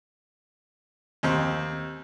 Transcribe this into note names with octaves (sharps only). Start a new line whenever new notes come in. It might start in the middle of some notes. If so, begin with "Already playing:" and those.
D#2 C4